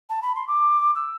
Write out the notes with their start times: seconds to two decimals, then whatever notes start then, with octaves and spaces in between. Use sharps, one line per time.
0.09 A5
0.22 B5
0.35 C6
0.47 D6
0.95 E6